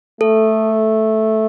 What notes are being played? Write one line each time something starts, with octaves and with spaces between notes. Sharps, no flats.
A3 A4